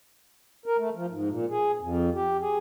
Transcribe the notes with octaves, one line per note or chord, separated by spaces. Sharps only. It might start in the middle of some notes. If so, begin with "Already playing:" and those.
A#4
A3
F3
G#2
A#2
G#4
F2
G4
G#4